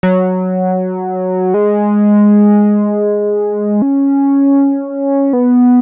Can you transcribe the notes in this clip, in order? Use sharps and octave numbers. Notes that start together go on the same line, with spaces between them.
F#3
G#3
C#4
B3